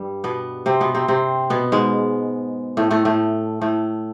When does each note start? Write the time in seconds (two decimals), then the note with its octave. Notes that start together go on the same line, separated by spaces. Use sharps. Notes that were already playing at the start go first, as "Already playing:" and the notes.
Already playing: G2 G3
0.24 B2 B3
0.66 C3 C4
0.81 B2 B3
0.95 C3 C4
1.08 C3 C4
1.50 B2 B3
1.72 G#2 G#3
2.77 A2 A3
2.91 A2 A3
3.05 A2 A3
3.61 A2 A3